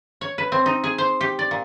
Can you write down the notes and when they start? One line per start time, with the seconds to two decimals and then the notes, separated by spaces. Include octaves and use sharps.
0.21 C#5
0.38 B4
0.52 C4
0.66 D#4
0.84 G#4
0.98 C5
1.21 G4
1.39 D5
1.51 A#2